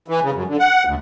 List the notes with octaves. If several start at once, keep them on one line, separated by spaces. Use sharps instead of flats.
E3
C#3
F#2
D3
F#5
D2